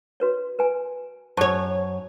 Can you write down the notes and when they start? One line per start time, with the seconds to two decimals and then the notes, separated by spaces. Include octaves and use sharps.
0.20 F#4 B4 C#5
0.59 B4 G#5
1.37 F#2 C5 C#5 A5 C#6